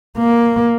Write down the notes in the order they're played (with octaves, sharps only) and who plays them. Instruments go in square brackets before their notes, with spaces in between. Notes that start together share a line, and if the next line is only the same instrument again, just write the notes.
[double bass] A#3